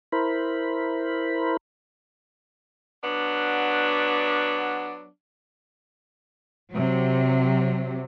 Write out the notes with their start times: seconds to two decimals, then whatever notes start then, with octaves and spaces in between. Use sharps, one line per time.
0.12 E4 A#4 C5 B5
3.03 F#3 B3 D4
6.75 C3 F#3